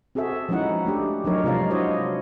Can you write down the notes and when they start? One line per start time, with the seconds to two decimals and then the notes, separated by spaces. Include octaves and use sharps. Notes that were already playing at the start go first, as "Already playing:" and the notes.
0.15 C4 F#4 G#4 A4 E5
0.49 F3 G#3 C#4 D#4 E4 F#5
0.86 A3 D4 G4
1.25 F3 F#3 D4 D#4 A#4 C#5
1.44 C3 G#3 F4 D5 F5
1.70 D4 E4 F#4 C5 C#5 D#5